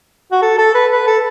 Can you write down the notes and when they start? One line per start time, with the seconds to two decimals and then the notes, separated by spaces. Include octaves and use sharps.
0.32 F#4
0.42 A4
0.58 A4
0.75 B4
0.92 B4
1.07 A4